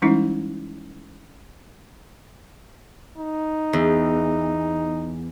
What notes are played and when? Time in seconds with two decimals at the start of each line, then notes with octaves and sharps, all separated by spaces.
0.02 E3 G3 G#3 C#4 D#4 E4
3.17 D#4
3.73 E2